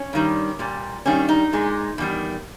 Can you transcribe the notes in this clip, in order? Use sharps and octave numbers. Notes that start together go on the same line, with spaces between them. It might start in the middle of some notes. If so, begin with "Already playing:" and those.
Already playing: C#4
G2 D#3 G3
A#2 G3
G2 D#3 G3 C#4
D#4
A#2 G#3
E2 D#3 G3